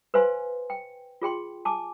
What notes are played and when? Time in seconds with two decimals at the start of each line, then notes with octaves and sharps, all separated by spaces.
0.14 B4 C5 F5 G#5 C6
0.70 G5
1.22 F4 G#4 G5 C6
1.65 G#5 A5 D6